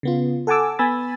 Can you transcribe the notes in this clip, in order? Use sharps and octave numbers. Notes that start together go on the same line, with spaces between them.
C#3 B3 F4
A4 F#5 G#5 A5 D6 E6
B3 G#5 B5 E6 A6